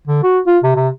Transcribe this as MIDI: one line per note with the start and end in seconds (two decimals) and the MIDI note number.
0.07 0.21 50
0.23 0.39 66
0.47 0.58 65
0.63 0.73 48
0.76 0.89 48